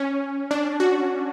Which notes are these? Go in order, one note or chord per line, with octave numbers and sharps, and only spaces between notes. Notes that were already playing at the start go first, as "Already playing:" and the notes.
Already playing: C#4
D4
F#4